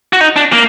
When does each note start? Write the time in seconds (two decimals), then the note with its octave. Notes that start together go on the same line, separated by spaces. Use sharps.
0.13 F#4
0.21 D#4
0.36 D4
0.52 A#3